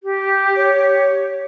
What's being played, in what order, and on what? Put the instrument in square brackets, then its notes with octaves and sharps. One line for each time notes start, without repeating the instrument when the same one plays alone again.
[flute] G4
[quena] C#5